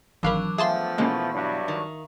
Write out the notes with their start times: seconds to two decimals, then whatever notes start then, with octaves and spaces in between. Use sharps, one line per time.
0.23 G#1 E3 F#3 D4 A#4 F5 B5
0.58 F3 A3 B3 G#4 E5 F5 A5 C6
0.98 B2 E3 G#3 A#3 C#4
1.33 G2 F#3 D4
1.68 D#3